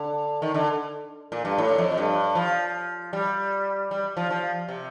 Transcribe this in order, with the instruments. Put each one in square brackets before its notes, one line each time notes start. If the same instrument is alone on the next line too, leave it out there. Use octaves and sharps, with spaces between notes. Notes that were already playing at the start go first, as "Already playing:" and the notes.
Already playing: [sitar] D3
D#3
D3
A#2
G2
A2
F2
G2
F3
G3
G3
F3
F3
C3